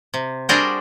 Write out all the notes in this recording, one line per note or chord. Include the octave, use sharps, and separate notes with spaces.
C3
G3 D4 F#4 G#4 A#4 C5